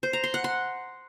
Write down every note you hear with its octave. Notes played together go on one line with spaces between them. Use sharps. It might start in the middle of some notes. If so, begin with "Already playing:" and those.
C5
A#5
C6
F#5
C6